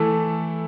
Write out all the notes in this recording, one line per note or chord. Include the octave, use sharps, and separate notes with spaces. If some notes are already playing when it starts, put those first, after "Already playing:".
Already playing: E3 A3 E4 A4